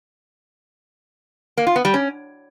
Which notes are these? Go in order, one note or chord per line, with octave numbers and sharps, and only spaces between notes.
A#3
F4
B3
G3
C#4